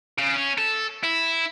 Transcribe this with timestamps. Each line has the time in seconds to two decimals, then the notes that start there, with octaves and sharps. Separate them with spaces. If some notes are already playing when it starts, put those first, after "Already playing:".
0.18 C#3
0.36 C#4
0.58 A4
1.03 E4